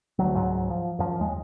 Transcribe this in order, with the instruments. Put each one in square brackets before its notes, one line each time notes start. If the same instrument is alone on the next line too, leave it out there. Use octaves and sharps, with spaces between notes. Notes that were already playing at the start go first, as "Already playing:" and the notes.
[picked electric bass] D2 F#3
C#2 G#2 F#3
F3
F#2 F3
D#2 G#3